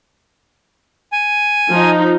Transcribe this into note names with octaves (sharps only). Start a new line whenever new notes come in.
G#5
F3 D#4